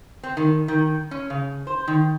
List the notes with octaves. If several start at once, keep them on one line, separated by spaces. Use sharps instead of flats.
C4
D#3
D#3
C#4
C#3
C5
D#3